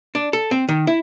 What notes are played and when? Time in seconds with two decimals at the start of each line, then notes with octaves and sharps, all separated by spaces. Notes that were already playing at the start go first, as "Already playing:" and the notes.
0.15 D4
0.33 A4
0.51 C4
0.69 D#3
0.87 E4